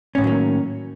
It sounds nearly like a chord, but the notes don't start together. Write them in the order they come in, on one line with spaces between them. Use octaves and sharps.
C#4 A2 D#3 F#3 A#3